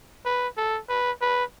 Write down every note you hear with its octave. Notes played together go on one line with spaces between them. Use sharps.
B4
A4
B4
B4